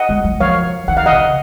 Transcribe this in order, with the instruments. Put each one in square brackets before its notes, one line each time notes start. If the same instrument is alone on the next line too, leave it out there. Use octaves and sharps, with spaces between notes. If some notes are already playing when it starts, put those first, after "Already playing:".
Already playing: [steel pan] D#5 F#5
[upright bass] G#3
F#3
[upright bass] F3 [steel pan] C#5 F5
[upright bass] D#3 [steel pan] F#5
[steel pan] F5
D#5 F#5
[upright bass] C#3